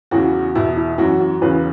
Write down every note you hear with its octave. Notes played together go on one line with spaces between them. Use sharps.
E2 C#3 E3 F#4
E2 B2 E4
E4
F#2 E3 F#4
F#4
E2 C#3 E3 B4